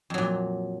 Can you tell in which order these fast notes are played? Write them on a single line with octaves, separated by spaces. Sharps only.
F2 F#3 A#2